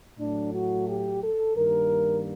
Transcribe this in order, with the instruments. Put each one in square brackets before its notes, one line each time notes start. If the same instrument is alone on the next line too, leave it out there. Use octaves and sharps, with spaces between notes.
[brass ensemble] A2 F#3 A3 D4
F#4
G4
A4
G2 D#3 G3 A#3 A#4